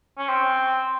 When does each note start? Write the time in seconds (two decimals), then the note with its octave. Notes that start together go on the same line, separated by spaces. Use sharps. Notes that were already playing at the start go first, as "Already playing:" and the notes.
0.18 C#4
0.29 C4